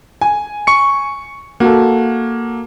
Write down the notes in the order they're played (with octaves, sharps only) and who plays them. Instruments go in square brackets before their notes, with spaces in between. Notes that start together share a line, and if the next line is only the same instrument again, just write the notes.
[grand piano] G#5
[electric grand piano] C#6 C#7
[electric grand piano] A#3 [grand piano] F#4 A4